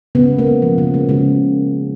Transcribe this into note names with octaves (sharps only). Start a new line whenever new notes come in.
C#3 B3
G#3
A#3
C#3
F3
C#3
G#3
C#3